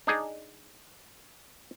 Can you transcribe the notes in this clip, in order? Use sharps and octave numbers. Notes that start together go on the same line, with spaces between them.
D4 D#4 G#4